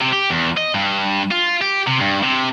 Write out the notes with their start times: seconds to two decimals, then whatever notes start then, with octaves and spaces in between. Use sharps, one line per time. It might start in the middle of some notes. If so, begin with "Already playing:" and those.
0.01 C3
0.13 G4
0.30 E2
0.57 D#5
0.75 G2
1.31 F4
1.61 G4
1.87 C3
2.01 G2
2.23 C3